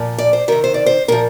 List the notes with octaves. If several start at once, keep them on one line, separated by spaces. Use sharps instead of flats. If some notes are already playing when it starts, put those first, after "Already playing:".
Already playing: A#2 F3
D5
C5
C3 D#3 A#4
C5
D5
C5
A#2 F3 A#4